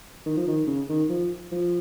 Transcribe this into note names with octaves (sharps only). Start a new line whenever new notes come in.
D#3
F3
D#3
C#3
D#3
F3
F3